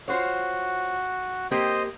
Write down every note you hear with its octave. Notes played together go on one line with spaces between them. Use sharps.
F4 F#4 C5 C#5
A#3 C4 G4 C5 D#5